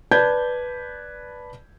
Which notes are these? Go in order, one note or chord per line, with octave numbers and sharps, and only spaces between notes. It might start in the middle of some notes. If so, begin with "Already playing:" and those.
B4 D5 A5 G6 G#6